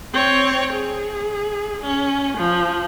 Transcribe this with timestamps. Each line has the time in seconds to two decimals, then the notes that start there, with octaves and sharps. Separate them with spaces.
0.13 C4 C#5
0.73 G#4
1.81 C#4
2.37 F3